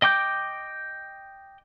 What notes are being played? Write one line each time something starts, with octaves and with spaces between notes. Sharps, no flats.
D#5 G5 D6 G6